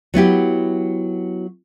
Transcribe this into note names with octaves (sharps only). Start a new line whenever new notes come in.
F#3 B3 E4 G4